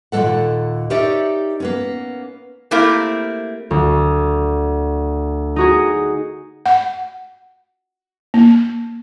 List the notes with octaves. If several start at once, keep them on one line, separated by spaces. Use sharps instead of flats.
D#2 A#2 F#3 A#3 A4 F#5
D#4 G4 A#4 C#5 D5 E5
A#3 B3 C#4
A3 A#3 C4 E4 G4 A#4
D2
D#4 F#4 G#4
F#5
A#3